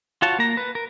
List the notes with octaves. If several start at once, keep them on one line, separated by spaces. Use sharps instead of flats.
F4 F#4 C#5 A5
A#3 A#5
B4
A#4